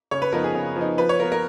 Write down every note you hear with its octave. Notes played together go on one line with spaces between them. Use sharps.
C#3 C#5
B4
F3 B3 D#4 A#4
G#4
C#3
F3 B3 D#4
F3 B4
C#5
B3 F4 A#4
A#4